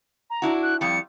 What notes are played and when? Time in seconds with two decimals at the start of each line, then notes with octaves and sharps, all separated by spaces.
0.30 A#5
0.42 D4 E4 F#4
0.62 F#6
0.81 F2 G3 C#7